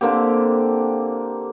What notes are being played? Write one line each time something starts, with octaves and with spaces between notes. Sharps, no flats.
D3 A#3 C4 G4